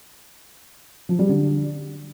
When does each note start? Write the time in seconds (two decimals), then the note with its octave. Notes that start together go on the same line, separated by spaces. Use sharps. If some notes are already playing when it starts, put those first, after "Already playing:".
1.09 F3
1.19 G3
1.29 D3